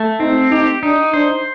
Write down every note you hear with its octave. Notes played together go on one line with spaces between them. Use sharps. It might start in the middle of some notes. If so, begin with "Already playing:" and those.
Already playing: A3
C4 D#4
D#4 G4
D4 D#4
D4 C5